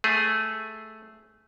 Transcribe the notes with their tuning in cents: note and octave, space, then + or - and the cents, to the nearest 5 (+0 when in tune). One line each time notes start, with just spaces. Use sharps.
A3 -5 G#4 +0